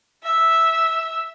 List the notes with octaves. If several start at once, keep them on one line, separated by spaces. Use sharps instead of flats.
E5